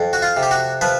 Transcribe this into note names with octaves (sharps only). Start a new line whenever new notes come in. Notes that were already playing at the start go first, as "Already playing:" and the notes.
Already playing: F2
F#4
F4
C3
G4
F#4
F3 B4